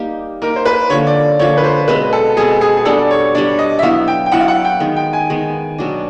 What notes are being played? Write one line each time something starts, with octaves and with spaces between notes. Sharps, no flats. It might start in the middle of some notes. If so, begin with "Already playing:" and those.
Already playing: G3 A#3 D#4 G4
A#3 D#4 G4 A#4
C5
B4
D3 F3 A#3 C#5
D5
D3 F3 A#3 C#5
B4
C5
B2 G#3 C4 B4
A4
B2 G#3 C4 G#4
G#4
G#4
G3 B3 D4 A4
D5
C#5
G3 B3 D4 D5
D#5
E5
F#3 B3 E4 F5
G5
G5
F#3 B3 E4 F#5
F5
F#5
G5
D#3 G#3 B3
G5
G#5
D#3 G#3 B3
B2 F#3 B3 D4